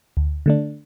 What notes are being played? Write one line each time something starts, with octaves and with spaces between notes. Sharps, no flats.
D2
D3 A3 D4